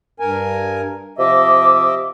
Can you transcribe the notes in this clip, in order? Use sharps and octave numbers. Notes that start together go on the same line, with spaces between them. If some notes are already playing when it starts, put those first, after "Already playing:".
G2 A#4 G#5
C3 F3 D#5 E5 D6